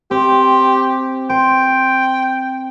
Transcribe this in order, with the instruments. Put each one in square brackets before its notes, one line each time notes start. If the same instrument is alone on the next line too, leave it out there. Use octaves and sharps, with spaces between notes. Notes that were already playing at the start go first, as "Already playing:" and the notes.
[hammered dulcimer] C4 [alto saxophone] G4
[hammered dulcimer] C5 [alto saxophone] G5